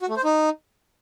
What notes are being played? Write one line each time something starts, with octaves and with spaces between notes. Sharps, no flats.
F#4
A3
C5
D#4